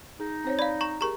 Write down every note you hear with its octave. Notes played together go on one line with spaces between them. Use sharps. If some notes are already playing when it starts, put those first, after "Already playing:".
D#4 G#4
C4 C5 C#5
D5 F5 B5
A#5 C#6
G4 G#4 A#4 A#5 C#6